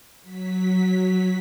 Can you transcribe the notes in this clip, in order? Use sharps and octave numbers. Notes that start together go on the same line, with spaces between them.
F#3 B6